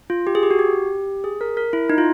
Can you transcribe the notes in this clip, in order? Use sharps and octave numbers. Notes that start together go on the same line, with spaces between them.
F4
G4
G#4
G4
F#4
G4
G#4
A#4
A#4
E4
D#4
F4